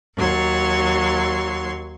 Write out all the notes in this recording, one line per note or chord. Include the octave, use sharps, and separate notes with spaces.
D#2 F#3 C6 C#6